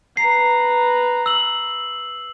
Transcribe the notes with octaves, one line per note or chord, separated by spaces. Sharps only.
B4 A#5 C7
E6 F#7